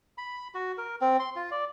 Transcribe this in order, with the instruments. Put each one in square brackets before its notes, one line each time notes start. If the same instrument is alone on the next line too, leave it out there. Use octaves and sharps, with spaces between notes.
[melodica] B5
F#4
A#4
C4
C6
F4
D5